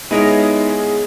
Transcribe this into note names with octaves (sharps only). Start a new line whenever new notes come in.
G#3 B3 D#4 E4 G#4 A#4 C#5 D#5